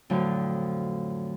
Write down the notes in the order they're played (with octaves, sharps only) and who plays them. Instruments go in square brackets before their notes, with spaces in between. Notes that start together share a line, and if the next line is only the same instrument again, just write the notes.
[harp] F2 A2 D3 F3 F#3